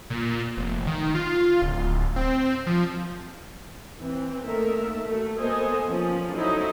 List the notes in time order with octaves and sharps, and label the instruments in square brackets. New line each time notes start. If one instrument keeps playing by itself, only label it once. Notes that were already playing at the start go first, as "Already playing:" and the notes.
[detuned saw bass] A#2
F1
D#3
F4
D1
C4
F3
[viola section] E3 C4
D#3 A3 A#3 A4 A#4 E5
A3 F#4
A#3 B3 A4 C5 D#5 G#5
F3 C#4
F#3 D#4 E4 A4 C5 D#5